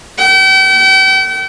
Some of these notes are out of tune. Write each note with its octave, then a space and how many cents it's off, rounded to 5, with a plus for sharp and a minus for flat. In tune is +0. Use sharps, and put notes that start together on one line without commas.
G5 -40